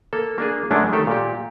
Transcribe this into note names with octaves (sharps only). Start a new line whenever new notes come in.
A#3 A4
A#3 D4 G#4
F#2 D3 G#3 A3 C#4 D4
D#3 A3 G4 A4
A#2 G4